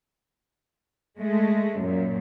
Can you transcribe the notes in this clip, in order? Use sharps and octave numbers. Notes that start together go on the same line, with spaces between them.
G#3 A3
F#2 A#2